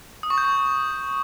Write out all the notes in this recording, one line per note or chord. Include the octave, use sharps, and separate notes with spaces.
D#6
C#6
G6
C#6